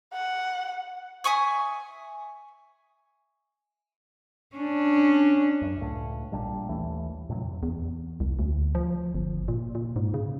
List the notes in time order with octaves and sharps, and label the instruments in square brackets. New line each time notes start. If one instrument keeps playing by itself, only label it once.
[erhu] F#5
[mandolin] E5 G#5 C#6 D#6
[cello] C#4 D4
[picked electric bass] F#2
C#2 A2
A#1 A#2 G3 D4
D#2 E3 A3
F2 A2 C3 F#3
[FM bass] E2
C2
D2
F3
G1
A#2
A#2
G#2
C#3